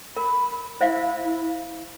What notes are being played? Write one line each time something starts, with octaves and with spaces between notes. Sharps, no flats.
A#4 B5
E4 C5 E5 F5